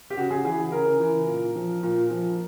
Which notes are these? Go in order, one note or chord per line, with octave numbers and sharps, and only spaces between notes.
G4
C#3 F#4
G#4
E3 G#4
C#3 A#4
E3
A#2
F3
A#2
F3